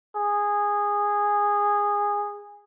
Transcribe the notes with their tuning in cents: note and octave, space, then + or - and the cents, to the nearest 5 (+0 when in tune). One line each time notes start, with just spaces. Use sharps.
G#4 -15